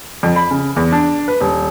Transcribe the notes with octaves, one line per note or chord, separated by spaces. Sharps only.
F2
B5
C#3
E2
D4
B4
D#1